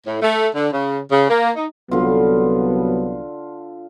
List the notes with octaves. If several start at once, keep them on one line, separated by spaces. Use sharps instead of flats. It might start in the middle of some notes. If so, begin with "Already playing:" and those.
A2
A3
D3
C#3
C#3
A#3
D#4
C2 D3 F#3 B3 F4